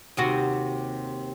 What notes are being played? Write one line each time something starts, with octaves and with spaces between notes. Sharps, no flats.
D#2 C3 F#4